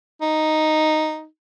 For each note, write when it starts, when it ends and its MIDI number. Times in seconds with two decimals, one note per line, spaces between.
0.22 1.26 63